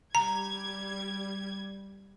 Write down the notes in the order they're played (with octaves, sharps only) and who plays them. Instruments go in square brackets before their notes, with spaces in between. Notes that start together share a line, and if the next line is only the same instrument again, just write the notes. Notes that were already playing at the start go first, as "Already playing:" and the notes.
[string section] G3 G#6 [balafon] A#5